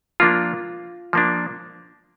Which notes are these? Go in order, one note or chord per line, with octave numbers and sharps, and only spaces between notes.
F3 A#3 D4 F4
F3 A#3 D4